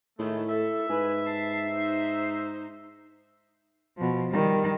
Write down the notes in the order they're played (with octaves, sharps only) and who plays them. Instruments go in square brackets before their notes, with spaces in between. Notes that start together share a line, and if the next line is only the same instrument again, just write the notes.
[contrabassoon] A2 [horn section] D#3 G#3 A3 [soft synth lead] E4
[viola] A4 [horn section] E5
[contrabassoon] G#2 [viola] B4 [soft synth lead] G#5
[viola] A5 [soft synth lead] C7
[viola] D#4 C5
[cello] B2 F3
D#3 G3